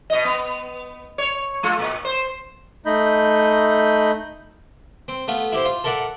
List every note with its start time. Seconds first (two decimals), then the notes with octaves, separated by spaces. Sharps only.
0.10 B2 D#5
0.25 B3
1.18 C#5
1.63 G#3 F4 A4
1.79 A#2
2.05 C5
2.86 A3 D#4 D#5 B5 G6
5.08 C4
5.28 A3 B3 F4
5.52 E4 G4 C5
5.65 F4
5.84 A4 A#4 D5 E5 F#5